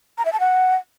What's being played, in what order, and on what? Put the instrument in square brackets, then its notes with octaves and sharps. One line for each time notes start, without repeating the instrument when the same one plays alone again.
[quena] A#5
E5
A5
F#5